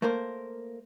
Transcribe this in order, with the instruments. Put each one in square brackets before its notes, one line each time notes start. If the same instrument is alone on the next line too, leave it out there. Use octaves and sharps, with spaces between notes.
[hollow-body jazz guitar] A3 A#3 A#4 C5